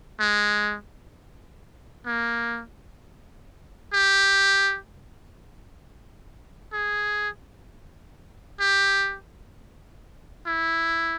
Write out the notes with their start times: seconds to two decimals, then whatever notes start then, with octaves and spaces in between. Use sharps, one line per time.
0.20 G#3
2.06 A#3
3.93 G4
6.73 G#4
8.60 G4
10.47 E4